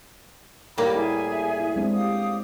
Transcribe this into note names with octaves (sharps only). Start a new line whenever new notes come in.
A2 G3 A#3 G4 B5 D6
E4 G#4 E5 G#5
E4
G#3 C4 D4
G4 F5 D#6